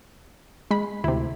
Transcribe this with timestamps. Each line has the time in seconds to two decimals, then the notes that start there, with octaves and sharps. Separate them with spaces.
0.71 G#3 B5
1.04 D2 C3 E4